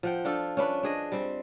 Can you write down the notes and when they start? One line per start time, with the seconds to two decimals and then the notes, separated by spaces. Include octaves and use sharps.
0.03 F3 F#5 G5
0.25 D4 F4 A4
0.57 C#4 D4 B4
0.83 D4 G#4 D#5
1.12 G3 C4